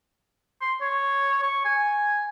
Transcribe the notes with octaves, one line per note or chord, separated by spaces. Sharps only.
C6
C#5
C#6
G#5